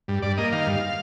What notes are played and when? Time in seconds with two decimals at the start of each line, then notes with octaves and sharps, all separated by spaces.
0.08 G2
0.22 G2 D5
0.37 A#3 D#5
0.52 D#3 F5
0.67 G2